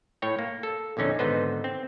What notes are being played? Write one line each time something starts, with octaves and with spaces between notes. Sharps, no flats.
A2 C#5 G5
A#3
A4
A#1 E2 D3 C#4 D#4
G#1 D3 B3 D#4 B4 C5
C4